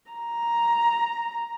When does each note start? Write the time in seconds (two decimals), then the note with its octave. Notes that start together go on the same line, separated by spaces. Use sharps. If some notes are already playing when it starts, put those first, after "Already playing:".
0.11 A#5